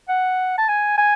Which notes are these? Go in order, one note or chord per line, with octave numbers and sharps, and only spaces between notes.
F#5
A5
G#5
G#5